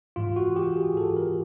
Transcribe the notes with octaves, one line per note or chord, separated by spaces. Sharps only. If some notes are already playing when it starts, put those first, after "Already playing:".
G#2 E3 F4
F#4
G4
G#4
G#2 E3 A4
A#4